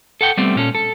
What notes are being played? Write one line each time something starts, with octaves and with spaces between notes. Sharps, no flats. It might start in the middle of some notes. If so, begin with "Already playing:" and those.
A4 F#5 G5
G3 A3 B3 C4
A#2 C#4 A4
A4